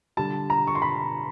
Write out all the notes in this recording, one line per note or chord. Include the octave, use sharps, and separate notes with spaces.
D3 G3 A5
A#5
C#6
C6
B5